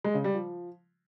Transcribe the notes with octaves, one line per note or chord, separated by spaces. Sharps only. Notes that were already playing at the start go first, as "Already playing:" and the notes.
G#3
C#3
G3
F3